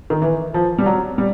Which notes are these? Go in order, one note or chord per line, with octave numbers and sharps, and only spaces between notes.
D#3
E3
F3
G3
F#3
G3